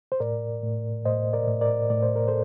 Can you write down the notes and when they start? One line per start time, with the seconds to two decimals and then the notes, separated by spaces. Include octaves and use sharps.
0.12 C5
0.20 A2 A#4 D5
0.63 A2
1.05 A2 C5 D#5
1.33 A#4 D5
1.47 A2
1.61 A#4 D5
1.90 A2 D5
2.03 C5
2.16 A#4
2.28 A4 C5